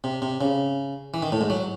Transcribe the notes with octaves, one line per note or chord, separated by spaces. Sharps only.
C3
C3
C#3
E3
D#3
A2
G#2
F#3